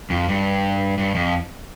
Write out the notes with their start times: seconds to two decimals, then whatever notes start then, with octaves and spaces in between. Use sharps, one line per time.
0.10 F2
0.28 G2
0.98 G2
1.15 F2